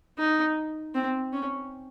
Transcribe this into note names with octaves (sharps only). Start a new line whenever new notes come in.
D#4
C4
C#4